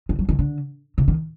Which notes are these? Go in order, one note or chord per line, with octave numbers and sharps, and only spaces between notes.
D#3
F#3
D#3
D3
C3
D#3